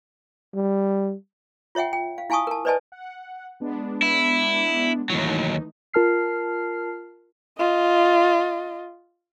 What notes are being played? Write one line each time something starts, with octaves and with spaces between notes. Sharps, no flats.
G3
F4 C#5 E5 F#5 G5
G5
F5
E4 F5 G#5 A5 C#6 D#6
A#4 A5
B4 C5 D5 D#5 G#5 A5
F#5
G#3 B3 D4
E4
D#2 E3 F#3 A3 D#4
F4 A#4 A5 F6 C7
F4 D#5